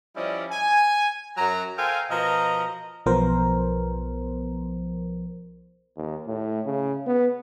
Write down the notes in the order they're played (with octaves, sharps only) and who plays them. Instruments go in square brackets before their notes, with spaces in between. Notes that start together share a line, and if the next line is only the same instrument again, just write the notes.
[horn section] F3 G3 C#4 E4 D5 D#5
G#5
F#2 F#3 F#4 A#5
A4 A#4 C5 F5 G5 G#5
B2 F3 A#4 D#5 A#5
[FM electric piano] B1 F3 B3 A#4 C5
[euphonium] D#2
A2
C#3
B3